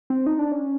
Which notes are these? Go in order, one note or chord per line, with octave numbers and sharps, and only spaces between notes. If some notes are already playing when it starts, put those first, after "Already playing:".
C4
D#4
D4
C#4